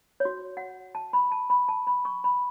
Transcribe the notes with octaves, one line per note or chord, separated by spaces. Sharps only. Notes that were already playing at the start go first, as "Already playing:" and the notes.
C#5
F#4
F#5
A5
B5
A5
B5
A5
B5
C#6
B5